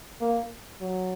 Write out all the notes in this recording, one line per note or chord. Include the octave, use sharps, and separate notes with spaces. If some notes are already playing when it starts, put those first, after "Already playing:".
A#3
F#3